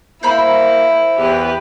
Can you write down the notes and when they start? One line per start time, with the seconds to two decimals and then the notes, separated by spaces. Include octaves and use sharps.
0.23 A#3 E4 C5 A#5 B5
1.17 E2 G4 B4